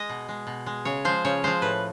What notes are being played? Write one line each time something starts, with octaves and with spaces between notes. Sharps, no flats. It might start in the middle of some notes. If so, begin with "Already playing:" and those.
Already playing: G#3 D#5
B2
G#3
B2
G#3
C#3 C#5
F3 G#3 C5
C#3 C#5
F3 G#3 C5
A2 B4